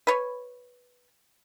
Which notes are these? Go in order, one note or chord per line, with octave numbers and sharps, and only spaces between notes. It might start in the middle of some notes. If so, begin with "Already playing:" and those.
B4 C#5